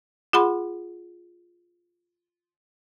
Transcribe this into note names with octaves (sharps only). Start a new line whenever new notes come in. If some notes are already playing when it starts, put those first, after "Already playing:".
F4 G#4 F#5 B5 C6